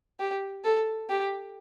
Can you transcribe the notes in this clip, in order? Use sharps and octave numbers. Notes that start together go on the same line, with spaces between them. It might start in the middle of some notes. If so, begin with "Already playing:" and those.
G4
A4
G4